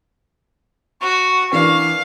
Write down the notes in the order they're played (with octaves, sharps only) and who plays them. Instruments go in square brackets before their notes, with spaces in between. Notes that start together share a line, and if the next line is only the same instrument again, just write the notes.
[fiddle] F#4 [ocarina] C#6
[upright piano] E3 D4 A#4 [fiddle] F5